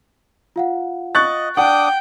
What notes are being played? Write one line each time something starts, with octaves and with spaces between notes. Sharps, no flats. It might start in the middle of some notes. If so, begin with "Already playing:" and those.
F4 F5 F#5
D#5 C#6 F#6 A6
D4 F#5 G5 D6 D#6